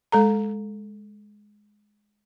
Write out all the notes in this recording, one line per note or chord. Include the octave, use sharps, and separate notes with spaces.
G#3 A4 A#5